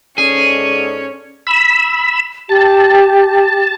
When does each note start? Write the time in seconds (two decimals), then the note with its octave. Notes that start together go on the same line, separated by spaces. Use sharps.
0.18 G#2 C#4 G#4 A4 D5
1.47 B5 E6
2.49 G4 A5